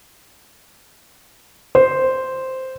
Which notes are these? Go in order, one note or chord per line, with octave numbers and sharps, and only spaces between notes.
C5